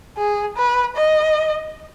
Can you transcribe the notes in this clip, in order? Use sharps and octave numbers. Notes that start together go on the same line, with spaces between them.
G#4
B4
D#5